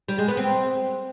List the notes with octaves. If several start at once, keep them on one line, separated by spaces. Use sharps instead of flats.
G3
G#3
B3
C4